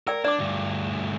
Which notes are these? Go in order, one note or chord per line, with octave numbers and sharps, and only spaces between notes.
A#4 D5 G5 E6
D4 D5 D6
D2 G2